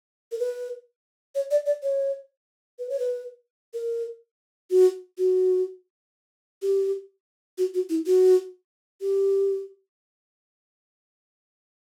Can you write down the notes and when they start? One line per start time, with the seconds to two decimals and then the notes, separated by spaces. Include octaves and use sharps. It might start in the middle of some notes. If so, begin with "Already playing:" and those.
0.32 A#4
0.39 B4
1.35 C#5
1.51 D5
1.66 D5
1.83 C#5
2.79 B4
2.89 C#5
2.99 B4
3.74 A#4
4.70 F#4
5.18 F#4
6.62 G4
7.58 F#4
7.74 F#4
7.90 E4
8.06 F#4
9.01 G4